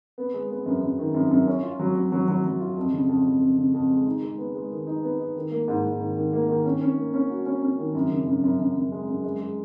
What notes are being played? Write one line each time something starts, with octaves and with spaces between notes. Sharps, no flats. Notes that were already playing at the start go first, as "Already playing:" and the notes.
B3
G#3
B3
F#2
F#2
D#3
F#2
F#2
C#4
F4
F#3
F#3
F#3
F#3
F#3
F4
F2
C#3
F2
F2
F2
C#3
F2
G#3
D#4
G#3
B3
G#3
D#3
D#4
B3
D#4
D#3
A#3
G#2
G#2
D#3
D#3
A#3
D#3
C#4
C#4
A#3
C#4
F#4
C#4
C#4
D#3
F#2
C#3
F#2
F#2
F#2
F#2
G#3
F#2
G#3
G#3